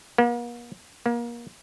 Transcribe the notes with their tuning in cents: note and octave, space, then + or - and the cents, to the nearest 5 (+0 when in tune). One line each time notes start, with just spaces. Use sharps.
A#3 +45
A#3 +30